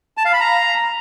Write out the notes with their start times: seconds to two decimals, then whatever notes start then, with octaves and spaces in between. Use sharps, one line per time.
0.17 A5
0.25 F5
0.33 B5
0.41 A#5